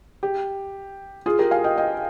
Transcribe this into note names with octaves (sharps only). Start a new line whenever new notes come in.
G4
F4 G#4
G4 A#4
F5 G#5
D#5 G5
D#5 G5